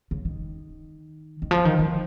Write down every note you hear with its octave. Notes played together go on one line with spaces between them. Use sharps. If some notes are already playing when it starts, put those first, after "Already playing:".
C#3
D#3
D#3
F3
D#3
F3